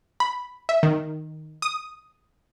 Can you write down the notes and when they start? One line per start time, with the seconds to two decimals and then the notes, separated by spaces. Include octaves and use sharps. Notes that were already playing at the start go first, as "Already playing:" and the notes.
0.20 B5
0.69 E5
0.83 D#3
1.62 D#6